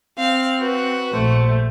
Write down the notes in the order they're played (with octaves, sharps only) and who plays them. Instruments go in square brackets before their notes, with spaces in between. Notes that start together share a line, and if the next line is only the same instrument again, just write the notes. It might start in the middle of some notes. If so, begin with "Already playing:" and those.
[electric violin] C4 [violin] F5
[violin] F#4 [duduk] B4
[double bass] A#1 [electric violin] A3 [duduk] C5